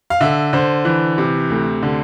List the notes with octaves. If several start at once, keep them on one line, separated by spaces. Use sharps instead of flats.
F5
D3 E5
D3 C5
E3
C3
D2
D3